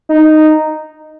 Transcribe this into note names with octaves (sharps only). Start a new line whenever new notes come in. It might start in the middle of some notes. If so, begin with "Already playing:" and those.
D#4